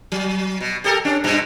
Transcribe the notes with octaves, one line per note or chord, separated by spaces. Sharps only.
F#3
B2
G4 A4 A#4
C#4 D4
G2 B2